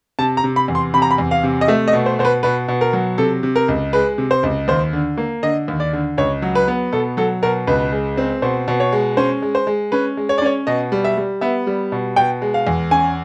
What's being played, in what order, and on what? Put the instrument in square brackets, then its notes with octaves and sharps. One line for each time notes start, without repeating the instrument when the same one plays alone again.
[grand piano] C3 A5
A#5
C3
B5
E2
C6
C3 B5
A#5
B5
E2
F5
C3
D#5
A3 E5
D#5
B2
C5
B2 C5
B4
B2 B4
B2
A#4
F#3
C3 A4
C3
A#4
C#2
G#3 B4
C3
C5
C#2
D#2 C5
D3
A#3
D3 D#5
D#2
D5
D3
C#2 C#5
F#3
B4
B3
B2 A4
F#3 A4
B2 A#4
C#2 B4
G#3
C4
B2 C5
B2
C#5
G#3
C#4 C5
G#3
C5
G#3
C#4 B4
G#3
C#5
D5
C#4 C#5
B2 D#5
G3
E5
G3
B3 E5
G3
B2
B2 G5
G#3
F5
E2
C#4 G#5